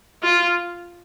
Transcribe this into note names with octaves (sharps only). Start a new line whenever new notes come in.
F4